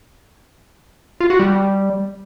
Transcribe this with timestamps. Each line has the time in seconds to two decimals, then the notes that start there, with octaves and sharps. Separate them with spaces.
1.20 F4
1.30 F#4
1.40 G3